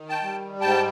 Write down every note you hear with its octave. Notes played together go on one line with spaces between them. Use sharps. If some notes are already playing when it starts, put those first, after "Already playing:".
Already playing: D#3
G5 A5
G3
G#2 G5 A5